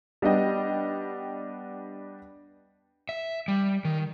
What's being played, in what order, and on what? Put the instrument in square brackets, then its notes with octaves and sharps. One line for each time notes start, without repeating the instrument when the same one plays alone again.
[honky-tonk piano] G3 B3 D4 D#5 G5
[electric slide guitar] E5
G3
D#3